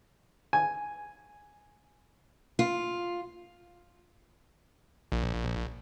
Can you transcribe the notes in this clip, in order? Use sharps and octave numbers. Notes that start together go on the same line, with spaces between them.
G#5
F4
A#1